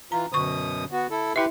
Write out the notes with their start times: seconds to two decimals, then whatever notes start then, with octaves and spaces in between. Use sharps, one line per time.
0.12 E3 F4 A#5
0.33 F#2 B2 D3 C#6 D#6
0.92 B3 F#4
1.11 E4 A4
1.36 E4 G4 B4 E5